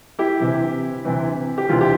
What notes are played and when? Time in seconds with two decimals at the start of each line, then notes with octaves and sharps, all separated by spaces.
0.19 E4 G4
0.40 D2 C3 E3
1.05 D2 C3 E3
1.58 G4
1.69 E1 D2 C3 E3 F4
1.81 G4